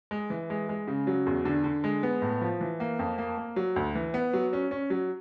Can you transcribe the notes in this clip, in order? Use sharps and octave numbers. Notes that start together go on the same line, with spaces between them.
G#3
E3
G#3
G#3
C#3
F#3
E2
D3
D3
G#3
B3
A2
F3
E3
A#3
F2
A#3
A#3
F#3
D2
E3
B3
F#3
C#4
C#4
F#3